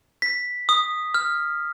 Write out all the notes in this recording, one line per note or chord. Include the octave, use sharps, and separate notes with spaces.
B6
D#6
F6